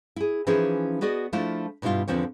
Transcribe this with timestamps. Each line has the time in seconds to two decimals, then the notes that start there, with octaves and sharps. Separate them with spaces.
0.16 E4 G#4
0.47 E3 F3 C#4 D#4 E4 G#4
1.01 B3 F#4 G#4 D5 D#5
1.33 F3 A3 D4 E4 F4
1.82 G2 B2 G3 E4 F4
2.08 E2 D3 F3 C4 C#5